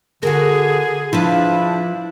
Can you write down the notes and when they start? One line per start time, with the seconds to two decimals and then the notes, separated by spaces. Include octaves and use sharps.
0.23 D3 F#4 G#4 A#4
1.13 F3 D4 E4 F4 B4